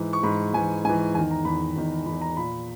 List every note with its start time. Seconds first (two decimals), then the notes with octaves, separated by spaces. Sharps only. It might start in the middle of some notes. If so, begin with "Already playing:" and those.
Already playing: G#2 E3
0.13 C#6
0.23 G#2 E3 B5
0.54 G#2 E3 G#5
0.84 G#2 G#5
0.89 E3
1.15 E2 G#5
1.18 D#3
1.31 A#5
1.45 E2 D#3 B5
1.76 E2 D#3
2.06 E2 D#3 B5
2.21 A#5
2.37 A#2 B5